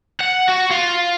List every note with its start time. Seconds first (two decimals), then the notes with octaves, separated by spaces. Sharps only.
0.20 F#5
0.48 F#4
0.71 F4